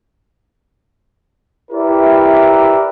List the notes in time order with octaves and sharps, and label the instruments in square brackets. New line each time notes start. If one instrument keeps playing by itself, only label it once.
[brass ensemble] E4 G4 A#4 B4 D5 E5